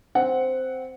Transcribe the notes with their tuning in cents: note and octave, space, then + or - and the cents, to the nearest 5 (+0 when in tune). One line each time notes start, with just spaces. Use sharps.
C4 -5 F#5 +0